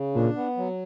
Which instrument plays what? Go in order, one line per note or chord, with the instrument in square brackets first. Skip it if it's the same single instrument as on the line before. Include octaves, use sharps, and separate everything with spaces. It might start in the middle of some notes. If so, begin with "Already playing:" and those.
Already playing: [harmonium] C#3
[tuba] A#2 [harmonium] D4
[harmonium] B3
F#3